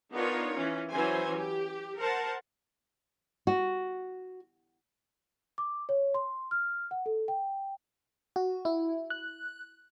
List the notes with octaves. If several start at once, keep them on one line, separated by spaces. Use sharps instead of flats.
B3 D4 D#4 F4 A#4 C#5
E3 C#4
E3 F#3 C#4 C5 G#5
G4
A#4 C5 F#5 A5
F#4
D6
C#5
C6
F6
F#5
A4
G5
F#4
E4
F#6